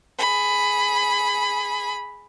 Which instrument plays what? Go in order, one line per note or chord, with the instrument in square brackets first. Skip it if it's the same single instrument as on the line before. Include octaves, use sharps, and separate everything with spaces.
[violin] G#4 B5